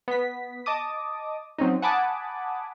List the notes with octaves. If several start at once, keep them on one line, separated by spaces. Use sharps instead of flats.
B3 B6
D#5 A5 D6 D#6
F#3 C4 C#4 D#4
F#5 G#5 A5 B5 D6 D#6